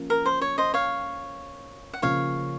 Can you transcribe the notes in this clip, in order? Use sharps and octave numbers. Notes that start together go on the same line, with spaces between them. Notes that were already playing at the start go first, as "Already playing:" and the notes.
Already playing: F3 A#3 C#4
A#4
C5
C#5
C5 D#5
C#5 F5
F#5
C#3 F3 A#3 C#4 F4 C#5 F5